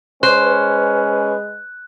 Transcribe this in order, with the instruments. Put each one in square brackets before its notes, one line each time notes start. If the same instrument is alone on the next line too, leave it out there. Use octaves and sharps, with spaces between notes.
[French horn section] G#3 B4 [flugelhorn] C#4 [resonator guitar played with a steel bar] C5 [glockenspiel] F#6